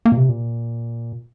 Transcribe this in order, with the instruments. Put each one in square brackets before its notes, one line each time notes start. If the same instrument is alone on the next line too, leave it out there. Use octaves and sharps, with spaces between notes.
[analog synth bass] A#3
A#2
C3
A#2